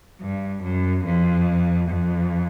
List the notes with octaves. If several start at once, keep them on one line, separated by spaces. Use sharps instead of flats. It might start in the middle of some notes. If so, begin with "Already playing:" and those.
G2
F#2
F2
F2